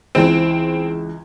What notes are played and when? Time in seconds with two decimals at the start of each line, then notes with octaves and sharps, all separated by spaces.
0.15 C#2 E3 C4